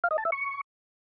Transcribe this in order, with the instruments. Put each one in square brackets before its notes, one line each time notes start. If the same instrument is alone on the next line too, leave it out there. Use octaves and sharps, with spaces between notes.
[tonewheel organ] F5
D#5
A5
E5
C#6